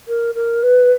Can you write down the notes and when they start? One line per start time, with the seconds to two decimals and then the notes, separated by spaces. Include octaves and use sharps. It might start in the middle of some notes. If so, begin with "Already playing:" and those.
0.08 A#4
0.34 A#4
0.63 B4